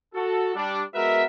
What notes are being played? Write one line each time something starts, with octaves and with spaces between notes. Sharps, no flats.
F#4 A4
G3 D4
G#3 B3 F#4 A#4 B4 E5